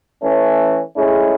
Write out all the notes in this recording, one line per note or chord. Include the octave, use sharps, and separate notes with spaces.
E3 A3 C#4
A2 G#3 C#4 E4 G#4